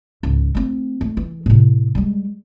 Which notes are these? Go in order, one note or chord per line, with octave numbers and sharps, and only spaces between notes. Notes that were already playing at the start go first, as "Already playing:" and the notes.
C#2 G#2
A3 C4
A3
E3
A2 C3
G3 G#3